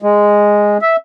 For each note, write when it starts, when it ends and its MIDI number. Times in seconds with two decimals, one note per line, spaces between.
0.02 0.78 56
0.82 0.96 76